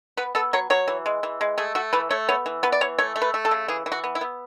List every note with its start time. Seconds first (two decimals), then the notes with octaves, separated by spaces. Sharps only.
0.17 B3 B4
0.35 B3 A4
0.53 F#3 C#5
0.70 F#3 C#5
0.88 E3
1.06 G#3
1.23 E3
1.41 G#3
1.58 A3 G#4
1.75 A3 F#4
1.93 E3 B4
2.11 A3 C#5
2.29 B3 C#5
2.46 E3
2.63 B3 B4
2.72 D5
2.81 E3 C#5
2.99 A3 C#5
3.16 A3
3.22 B4
3.34 A3
3.45 A4
3.51 C#3
3.68 E3 G#4
3.86 E3
3.92 F#4
4.04 B3
4.15 E4
4.21 B3